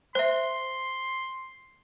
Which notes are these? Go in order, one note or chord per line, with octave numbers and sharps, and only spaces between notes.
C5 E5 C6